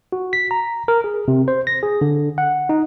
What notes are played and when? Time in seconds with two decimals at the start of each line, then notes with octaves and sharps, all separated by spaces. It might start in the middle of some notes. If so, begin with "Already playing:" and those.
0.12 F#4
0.33 B6
0.51 A#5
0.88 A#4
1.04 G#4
1.28 C3
1.48 C5
1.67 A#6
1.83 G#4
2.01 D3
2.38 F#5
2.69 D#4